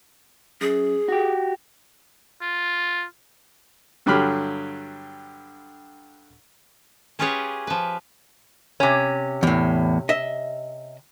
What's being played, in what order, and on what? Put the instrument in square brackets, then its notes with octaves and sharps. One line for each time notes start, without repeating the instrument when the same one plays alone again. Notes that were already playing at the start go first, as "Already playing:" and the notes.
[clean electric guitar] F#2 [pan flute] G#4
[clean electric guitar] F#4 G4
[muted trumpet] F4
[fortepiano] G2 D3 F#3 G4 B5 F6
[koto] C#4 F4 G4 G#4 B4 C#5
F3 B4
[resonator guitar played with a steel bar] C3 C#4
[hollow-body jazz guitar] E2 A2
D#5 E5